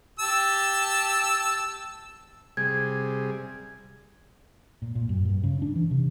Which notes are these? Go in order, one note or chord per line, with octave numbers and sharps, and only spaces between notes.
G4 A5 E6
C3 G3 G#4 G#6
A#2
A#2
F#2
G2
C#3
D4
E3
C3